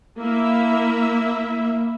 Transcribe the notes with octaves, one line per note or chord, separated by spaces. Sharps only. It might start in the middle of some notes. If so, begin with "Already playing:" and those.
A#3 E4 E5